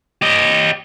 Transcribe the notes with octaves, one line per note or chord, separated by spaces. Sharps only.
G4 D#5